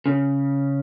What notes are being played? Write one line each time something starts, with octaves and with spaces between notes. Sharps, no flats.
C#3